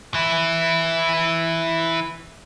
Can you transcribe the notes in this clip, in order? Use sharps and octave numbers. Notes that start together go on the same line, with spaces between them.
E3 E4